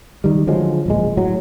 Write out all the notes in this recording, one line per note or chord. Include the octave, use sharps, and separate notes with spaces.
D#3 G3
D3 F3 F#3 G#3
D1 A#1 G#3
A2 F#3